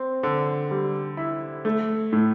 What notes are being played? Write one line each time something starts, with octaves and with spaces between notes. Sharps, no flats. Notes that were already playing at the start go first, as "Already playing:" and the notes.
Already playing: C4
D3
G3
E4
A3
A2